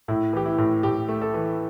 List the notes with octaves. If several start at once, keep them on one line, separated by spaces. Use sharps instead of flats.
A2 E4
E3 G4
E4
A2
A2 G4
A3
A4
E3